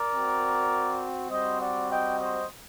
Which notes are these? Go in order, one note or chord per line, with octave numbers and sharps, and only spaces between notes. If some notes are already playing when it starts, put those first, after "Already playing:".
Already playing: A#4 D5
C4 F#4
G3 C4 F#4 C5 D#5
D5 F#5
D#5 G5
C5 D#5